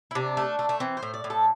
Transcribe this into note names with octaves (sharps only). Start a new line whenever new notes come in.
E4
C3 D4
A3
A3
A3
E3 C4
C5
A2
D5
A2
A4